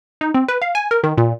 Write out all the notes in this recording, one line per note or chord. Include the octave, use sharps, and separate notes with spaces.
D#4
C4
B4
F5
G#5
A#4
D#3
A#2